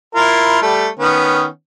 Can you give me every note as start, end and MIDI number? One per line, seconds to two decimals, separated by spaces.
0.15 0.59 64
0.15 0.59 65
0.15 0.59 70
0.62 0.88 55
0.62 0.88 57
0.99 1.46 51
0.99 1.46 59
0.99 1.46 61